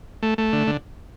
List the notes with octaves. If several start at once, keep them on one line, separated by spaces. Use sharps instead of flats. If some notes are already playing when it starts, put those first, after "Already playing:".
A3
A3
D3
D3